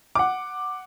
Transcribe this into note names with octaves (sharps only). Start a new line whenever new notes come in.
F#5 D6